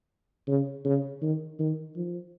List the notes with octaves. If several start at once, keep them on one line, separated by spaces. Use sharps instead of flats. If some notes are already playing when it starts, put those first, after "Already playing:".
C#3
C#3
D#3
D#3
F3